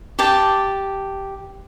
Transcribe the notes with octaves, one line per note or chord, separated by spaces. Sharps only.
G4 A5